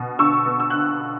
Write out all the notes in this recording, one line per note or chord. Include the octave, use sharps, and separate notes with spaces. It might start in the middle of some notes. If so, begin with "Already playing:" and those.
Already playing: B2
D3 C#6 E6
B3
E6
D3 F#6